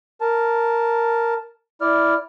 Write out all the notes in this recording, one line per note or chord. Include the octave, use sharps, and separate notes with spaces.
A#4 A5
E4 D5 F6